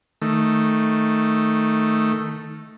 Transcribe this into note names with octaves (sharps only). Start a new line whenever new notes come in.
D#3 A3